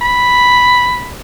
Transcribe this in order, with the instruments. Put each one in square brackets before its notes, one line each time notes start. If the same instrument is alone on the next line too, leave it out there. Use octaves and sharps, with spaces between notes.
[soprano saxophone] B5